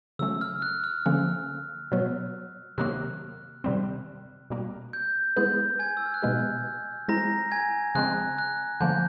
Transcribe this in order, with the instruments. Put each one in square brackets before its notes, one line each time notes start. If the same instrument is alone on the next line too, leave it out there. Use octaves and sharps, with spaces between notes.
[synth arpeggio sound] C#3 F#3 A3 C#4 [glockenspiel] E6
[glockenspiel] F6
F#6
F6
[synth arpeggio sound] D3 F3 A#3 C#4
B2 F#3 B3
[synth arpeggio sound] C3 D#3 F#3 A#3 [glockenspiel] F#6
[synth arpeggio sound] C3 D#3 G3 C4
B2 G3 A#3
[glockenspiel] G6
[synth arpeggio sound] G#3 B3 E4 G#4 B4 [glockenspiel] G6
[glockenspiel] G#5 G#6
E6
F6
F#6
[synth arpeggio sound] B2 G#3 B3 D#4 G4 [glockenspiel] G6
[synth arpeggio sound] G#3 C4 E4 [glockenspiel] A#5 A#6
[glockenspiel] G#5 G#6
[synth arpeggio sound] C#3 F3 G#3 C4 [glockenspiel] F#6
[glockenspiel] F#6
[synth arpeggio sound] D3 F3 A#3 [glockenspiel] G6